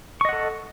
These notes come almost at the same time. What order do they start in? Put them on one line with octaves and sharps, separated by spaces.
C#6 D#5 F#5 A4